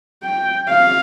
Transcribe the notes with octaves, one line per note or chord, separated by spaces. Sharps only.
G5
F5